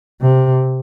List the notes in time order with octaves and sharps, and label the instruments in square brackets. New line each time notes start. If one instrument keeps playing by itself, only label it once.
[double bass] C3